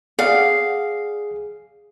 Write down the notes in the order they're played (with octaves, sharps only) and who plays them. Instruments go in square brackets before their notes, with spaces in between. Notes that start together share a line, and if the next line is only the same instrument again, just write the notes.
[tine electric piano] G#4 [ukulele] D5 F#5 [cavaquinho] F5